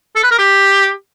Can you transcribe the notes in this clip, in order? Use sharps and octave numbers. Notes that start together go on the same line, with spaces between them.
A4
B4
A#4
G4